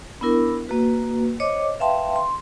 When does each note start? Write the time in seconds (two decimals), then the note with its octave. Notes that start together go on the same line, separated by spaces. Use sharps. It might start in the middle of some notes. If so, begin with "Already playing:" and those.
0.21 B3 D4 E4 A#4
0.67 A#3 F#4 B4
1.40 C5 C#5 D#5 D6
1.80 B4 E5 F5 G5 A5 C6
2.16 C6